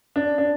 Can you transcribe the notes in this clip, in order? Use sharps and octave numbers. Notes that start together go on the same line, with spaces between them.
D4
D4